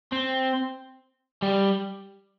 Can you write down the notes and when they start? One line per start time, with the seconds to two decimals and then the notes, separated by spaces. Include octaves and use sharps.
0.12 C4
1.42 G3